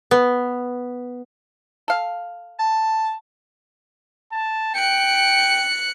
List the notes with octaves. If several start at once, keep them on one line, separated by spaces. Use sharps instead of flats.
B3
A4 F5
A5
A5
G5 F#6 C#7